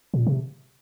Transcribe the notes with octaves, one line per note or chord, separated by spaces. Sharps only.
A#2
C3